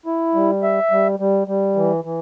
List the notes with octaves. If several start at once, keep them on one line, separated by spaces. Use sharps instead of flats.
E4
G3
E5
G3
G3
G3
E3
E3